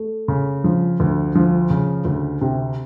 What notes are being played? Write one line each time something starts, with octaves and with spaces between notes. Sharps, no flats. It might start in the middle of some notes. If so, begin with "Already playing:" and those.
Already playing: A3
C#3
F3
D2
F3
C#3
D2
C3